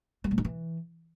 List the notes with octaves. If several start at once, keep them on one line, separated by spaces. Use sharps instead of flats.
G3
A2
D#3
E3